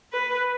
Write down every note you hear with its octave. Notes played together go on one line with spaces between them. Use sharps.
B4